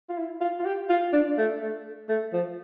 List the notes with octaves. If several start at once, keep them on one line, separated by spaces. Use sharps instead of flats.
F4
E4
F4
F4
G4
F4
D4
A3
A3
A3
F3